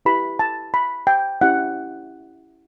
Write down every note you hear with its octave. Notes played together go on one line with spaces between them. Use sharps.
E4 G4 B4 B5
A5
B5
G5
C#4 E4 G4 F#5